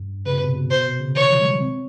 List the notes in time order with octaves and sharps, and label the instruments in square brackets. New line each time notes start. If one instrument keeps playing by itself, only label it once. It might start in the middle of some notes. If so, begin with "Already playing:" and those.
Already playing: [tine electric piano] G2
[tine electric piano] C#3 [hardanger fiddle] B4
[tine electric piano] B2
C3
B2
[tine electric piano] B2 [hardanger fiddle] C5
[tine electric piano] C3
C#3
[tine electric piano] D#3 [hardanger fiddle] C#5
[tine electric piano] F3
G#3
G3
C4